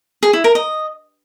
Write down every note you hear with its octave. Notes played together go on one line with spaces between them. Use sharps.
G#4
E4
A#4
D#5